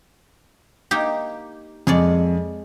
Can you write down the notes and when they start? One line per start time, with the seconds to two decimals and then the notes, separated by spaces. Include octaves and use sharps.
0.91 A#3 D#4 G4
1.87 F2 G#3 C#5 D5